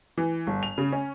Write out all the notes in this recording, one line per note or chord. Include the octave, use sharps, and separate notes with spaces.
E3
G1
F7
C#3
C#4